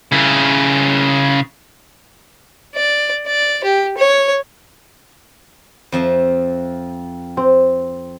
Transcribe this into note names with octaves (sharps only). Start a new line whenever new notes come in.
C#3 E4
D5
D5
G4
C#5
F2 F3 E5
C4